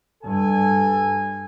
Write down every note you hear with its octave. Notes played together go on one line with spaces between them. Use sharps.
G2 A4 G#5